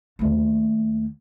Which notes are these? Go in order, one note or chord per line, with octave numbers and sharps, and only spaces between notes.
D#2 A3